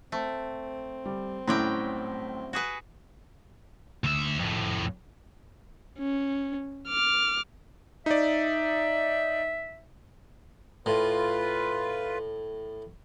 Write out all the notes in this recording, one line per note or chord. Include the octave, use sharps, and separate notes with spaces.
A3 C4
G3
A2 F#3 G3 A3 C#4 G5 C6
F#4 G#4 B4
D2 E5
F2 A2
C#4
D6 F6
D#4 D5 E5
A2 F4 B4